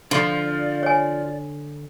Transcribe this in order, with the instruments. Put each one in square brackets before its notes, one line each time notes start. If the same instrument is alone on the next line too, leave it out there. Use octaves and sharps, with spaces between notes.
[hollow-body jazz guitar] D3 C6 [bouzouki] F3 [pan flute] D5
[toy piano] C#5 G#5